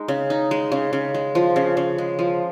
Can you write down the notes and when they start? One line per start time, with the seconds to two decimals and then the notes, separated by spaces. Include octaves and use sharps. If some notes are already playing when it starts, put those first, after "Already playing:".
Already playing: G#3 D#4
0.08 C#3
0.30 D#4
0.51 G#3
0.72 C#3
0.93 C#3
1.14 G#3
1.35 F3
1.56 C#3
1.77 C#3
1.98 G#3
2.19 F3